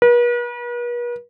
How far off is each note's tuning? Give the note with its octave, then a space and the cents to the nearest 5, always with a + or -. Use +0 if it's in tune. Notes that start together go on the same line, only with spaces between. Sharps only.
B4 -45